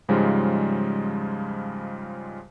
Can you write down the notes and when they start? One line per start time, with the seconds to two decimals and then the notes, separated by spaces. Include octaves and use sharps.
0.09 G#2 C#3 F3 G3 G#3